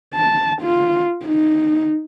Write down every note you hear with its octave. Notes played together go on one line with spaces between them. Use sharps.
A5
F4
D#4